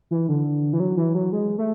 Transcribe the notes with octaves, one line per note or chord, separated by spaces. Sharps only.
E3
D3
E3
F#3
E3
F#3
G#3
A3